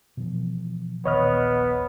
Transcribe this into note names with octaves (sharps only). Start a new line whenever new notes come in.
B2 E3 F3
D#1 A#1 D#3 B3 C#5 D#5 F6